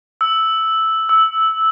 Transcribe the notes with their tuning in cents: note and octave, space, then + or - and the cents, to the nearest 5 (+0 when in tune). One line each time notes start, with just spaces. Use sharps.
E6 -5
E6 -10